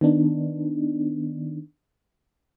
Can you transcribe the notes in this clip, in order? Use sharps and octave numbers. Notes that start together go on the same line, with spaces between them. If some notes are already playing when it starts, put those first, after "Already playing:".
D#3 B3 D4 D#4